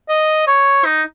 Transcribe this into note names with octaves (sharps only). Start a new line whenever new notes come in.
D#5
C#5
D#4